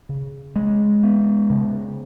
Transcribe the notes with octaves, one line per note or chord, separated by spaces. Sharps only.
C#3
G#3
B3
C#3